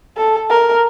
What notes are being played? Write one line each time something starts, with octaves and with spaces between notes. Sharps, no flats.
A4
A#4